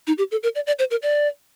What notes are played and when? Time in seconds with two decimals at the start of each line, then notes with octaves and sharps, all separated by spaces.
0.07 D#4
0.18 G4
0.31 A4
0.43 A#4
0.55 D5
0.67 D5
0.79 C5
0.91 A#4
1.02 D5